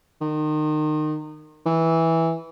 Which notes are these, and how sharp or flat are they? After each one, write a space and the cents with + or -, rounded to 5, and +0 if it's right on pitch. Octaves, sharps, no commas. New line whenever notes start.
D#3 -25
E3 -10